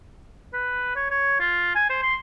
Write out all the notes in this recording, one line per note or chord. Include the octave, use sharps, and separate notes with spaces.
B4
C#5
C#5
F4
G#5
C5
C6